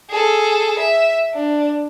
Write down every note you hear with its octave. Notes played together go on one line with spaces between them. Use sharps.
G#4 A4
E5
D4